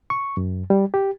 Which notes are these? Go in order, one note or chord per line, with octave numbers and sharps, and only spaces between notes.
C#6
F#2
G3
G4